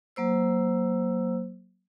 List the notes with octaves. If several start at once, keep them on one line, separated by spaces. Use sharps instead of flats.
F#3 A#3 C5 E6